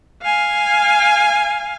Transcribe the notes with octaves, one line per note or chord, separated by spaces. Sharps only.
F5 G#5